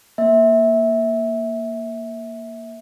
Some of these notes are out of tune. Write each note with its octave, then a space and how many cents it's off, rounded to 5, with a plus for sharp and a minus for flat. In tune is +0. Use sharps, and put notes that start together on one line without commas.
A#3 +0 E5 -15